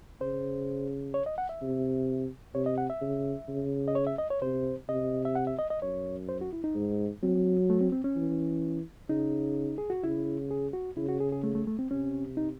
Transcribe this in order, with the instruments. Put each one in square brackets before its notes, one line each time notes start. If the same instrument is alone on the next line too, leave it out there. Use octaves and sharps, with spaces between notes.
[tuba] C#3 [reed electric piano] C5
[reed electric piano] C#5
D#5
F#5
E5
[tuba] C3
[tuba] C3 [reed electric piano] C#5
[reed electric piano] D#5
F#5
E5
[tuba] C#3
C#3
[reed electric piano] D#5
C#5
E5
D#5
C#5
[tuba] C3 [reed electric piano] C5
[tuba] C3 [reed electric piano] D#5
[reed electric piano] E5
F#5
E5
D#5
D#5
[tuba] F#2 [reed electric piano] C#5
[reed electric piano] C5
F#4
E4
D#4
[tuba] G#2
[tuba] F#3 [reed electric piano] C4
[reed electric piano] A3
C4
C4
C#4
[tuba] E3
[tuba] C#3 [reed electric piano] D#4
[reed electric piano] G#4
F#4
[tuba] C#3 [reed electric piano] E4
[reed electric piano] G#4
F#4
[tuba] C#3 [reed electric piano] E4
[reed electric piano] F#4
G#4
G#4
A3
A3
A3
C4
[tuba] C3 [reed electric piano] C#4
[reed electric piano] D#4